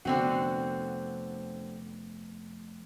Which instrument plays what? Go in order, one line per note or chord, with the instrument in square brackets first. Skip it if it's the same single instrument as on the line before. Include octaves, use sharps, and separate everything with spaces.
[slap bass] F1 B3 [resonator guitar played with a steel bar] D3 C4 F#4